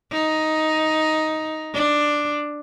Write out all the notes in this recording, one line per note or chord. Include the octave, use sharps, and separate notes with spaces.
D#4
D4